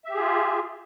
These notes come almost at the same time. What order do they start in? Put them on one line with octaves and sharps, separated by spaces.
E5 G4 G#4 F4